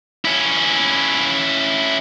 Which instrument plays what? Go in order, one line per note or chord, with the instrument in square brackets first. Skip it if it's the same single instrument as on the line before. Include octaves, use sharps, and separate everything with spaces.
[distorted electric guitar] C#4 E4